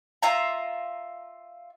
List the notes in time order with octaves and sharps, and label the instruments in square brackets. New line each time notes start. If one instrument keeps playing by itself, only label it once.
[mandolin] F4 E5 A#5